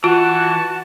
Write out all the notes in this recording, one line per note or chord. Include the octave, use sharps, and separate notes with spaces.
E3 F4 F#4 A5